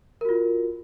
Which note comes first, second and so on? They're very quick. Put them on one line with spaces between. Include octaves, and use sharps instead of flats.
A#4 F#4 F4